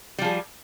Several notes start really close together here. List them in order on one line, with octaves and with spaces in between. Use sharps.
G3 F3 G#4